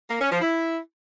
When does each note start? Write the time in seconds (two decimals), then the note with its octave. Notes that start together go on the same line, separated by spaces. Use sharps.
0.10 A#3
0.20 C#4
0.31 F3
0.41 E4